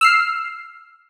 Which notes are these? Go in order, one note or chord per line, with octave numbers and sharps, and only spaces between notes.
E6 F6 C7